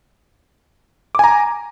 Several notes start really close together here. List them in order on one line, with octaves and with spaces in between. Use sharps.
D6 G#5 A#5